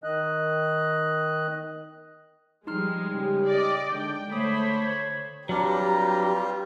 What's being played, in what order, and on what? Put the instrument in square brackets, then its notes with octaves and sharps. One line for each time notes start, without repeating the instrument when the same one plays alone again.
[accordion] D#3 D#5 F#6
[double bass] F3 G3 [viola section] G#3 [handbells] D#4 C6 F6
[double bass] C#3 [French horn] G4
[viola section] D5 D#5
[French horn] D3 [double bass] G#3 [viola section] G5
[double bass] D3 [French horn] A3 [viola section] C5 C#5 B5 [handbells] D6 D#6
[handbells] G#6
[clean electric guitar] F#3 D4 [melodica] G3 F4 [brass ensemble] C4 B4 A#5 [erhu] G4